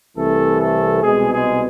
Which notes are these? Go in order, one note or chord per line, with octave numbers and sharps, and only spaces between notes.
C2 C3 E3 A3 A4
A3 A4
C2 B2 G#3 G#4
G#3 G#4